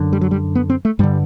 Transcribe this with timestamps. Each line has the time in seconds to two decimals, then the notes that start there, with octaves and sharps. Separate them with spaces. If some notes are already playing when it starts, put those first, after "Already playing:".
Already playing: F#2 D3
0.13 G3
0.21 F#3
0.31 G3
0.55 B3
0.70 C4
0.85 A3
0.99 G2 D3 G3